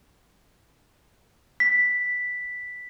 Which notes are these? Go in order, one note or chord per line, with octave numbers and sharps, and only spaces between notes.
B6